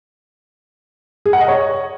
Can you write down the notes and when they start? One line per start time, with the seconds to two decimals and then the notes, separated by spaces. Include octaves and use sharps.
1.26 G#4
1.33 F#5
1.41 D#5
1.48 C#5